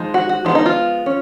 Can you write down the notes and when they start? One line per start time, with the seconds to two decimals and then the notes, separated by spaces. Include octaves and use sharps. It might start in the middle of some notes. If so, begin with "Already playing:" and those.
Already playing: F3 G#3 D#4
0.14 F#4
0.29 F#4
0.45 F3 G#3 B3 D#4 F4
0.55 D#4
0.66 F4
1.06 C#4